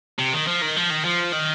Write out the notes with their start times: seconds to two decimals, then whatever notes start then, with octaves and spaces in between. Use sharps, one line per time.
0.19 C3
0.33 D#3
0.47 F3
0.62 D#3
0.76 F3
0.90 D#3
1.04 F3
1.32 D#3